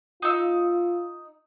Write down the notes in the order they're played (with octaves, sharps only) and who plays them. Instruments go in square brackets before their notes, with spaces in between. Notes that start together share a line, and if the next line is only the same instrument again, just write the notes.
[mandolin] D#4 E6 [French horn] F4